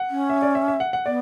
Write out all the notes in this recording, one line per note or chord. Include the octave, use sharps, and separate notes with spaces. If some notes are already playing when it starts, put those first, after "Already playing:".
Already playing: F#5
C#4
E5
D5
E5
E5
F#5
F#5
B3 D5